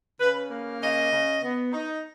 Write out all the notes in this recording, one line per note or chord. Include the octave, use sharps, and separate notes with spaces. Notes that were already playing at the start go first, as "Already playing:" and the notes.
C#3 B4
A#3
C#3 D#5
C#3
B3
D#4